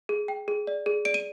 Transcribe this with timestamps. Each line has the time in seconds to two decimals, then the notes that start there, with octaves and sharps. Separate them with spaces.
0.09 G#4
0.28 G5
0.48 G#4
0.67 D5
0.86 G#4
1.05 D5 D7
1.14 D#7